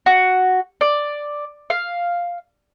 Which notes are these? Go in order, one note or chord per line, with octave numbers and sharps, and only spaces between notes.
F#4
D5
F5